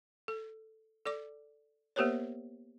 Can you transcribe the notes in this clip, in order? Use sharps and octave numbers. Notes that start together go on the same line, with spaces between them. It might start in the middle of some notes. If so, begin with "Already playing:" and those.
A4
A4 D5 D6
A#3 B3 G4 A#4 C5 C#5